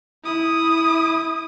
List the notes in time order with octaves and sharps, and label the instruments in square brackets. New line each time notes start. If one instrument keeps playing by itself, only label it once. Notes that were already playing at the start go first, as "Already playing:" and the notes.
[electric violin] E4 D#6